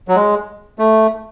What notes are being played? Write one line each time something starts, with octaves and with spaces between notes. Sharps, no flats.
F#3
G#3
A3